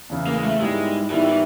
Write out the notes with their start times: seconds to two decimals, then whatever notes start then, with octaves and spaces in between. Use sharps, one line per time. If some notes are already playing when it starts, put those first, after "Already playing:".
0.10 E2 C#3 E3
0.27 A#3
0.35 G#3
0.43 A3
0.60 G#2 D#3 G3 G#3 B3 E4
1.10 G#2 D#3 E3 G3 B3 E4
1.27 E3